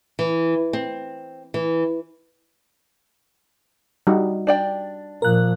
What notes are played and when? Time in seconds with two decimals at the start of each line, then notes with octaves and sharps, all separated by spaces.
0.19 E3
0.73 C4
1.54 E3
4.07 G3 D#4 F#4
4.47 D4 D5 G5
5.22 A#2 F3 A#4 F#6